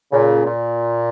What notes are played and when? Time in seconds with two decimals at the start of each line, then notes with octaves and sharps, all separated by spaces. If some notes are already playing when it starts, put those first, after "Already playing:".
0.12 A#2 C#3
0.46 A#2